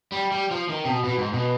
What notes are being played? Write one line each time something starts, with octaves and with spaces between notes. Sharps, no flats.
G3
G3
F3
D#3
C3
B2
B2
G#2
B2